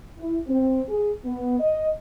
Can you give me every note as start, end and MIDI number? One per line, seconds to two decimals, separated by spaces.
0.19 0.38 64
0.48 0.82 60
0.89 1.13 68
1.25 1.55 59
1.60 1.89 75